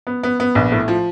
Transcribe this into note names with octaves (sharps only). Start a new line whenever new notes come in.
B3
B3
B3
A#1
A2
F3